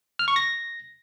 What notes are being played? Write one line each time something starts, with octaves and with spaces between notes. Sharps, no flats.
F6
C#6
A#6